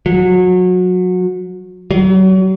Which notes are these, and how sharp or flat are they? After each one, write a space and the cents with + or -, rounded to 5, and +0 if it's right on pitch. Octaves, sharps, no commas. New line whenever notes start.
F#3 -25
F#3 +35